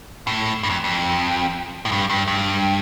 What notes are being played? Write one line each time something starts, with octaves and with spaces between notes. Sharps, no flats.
A2
G2
F2
F2
A2
G2
G2
G2